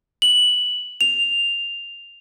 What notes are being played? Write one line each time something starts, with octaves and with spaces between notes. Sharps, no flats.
F#7
F7